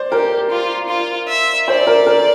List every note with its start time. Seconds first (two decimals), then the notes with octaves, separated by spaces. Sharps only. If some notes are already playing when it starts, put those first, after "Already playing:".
Already playing: C5 D5
0.12 G4 A#4
0.50 F4
0.89 F4
1.28 E5
1.67 C5 D5
1.87 A#4
2.06 A#4